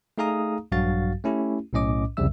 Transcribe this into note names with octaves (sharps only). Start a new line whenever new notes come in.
A3 D#4 G#4 F5 A#5 D#6
A#1 G2 F#3 F#4 F5 A6
A3 C#4 E4 G4
B1 A2 C#4 D#5 D6
C2 F2 C#3 G3 E5 E6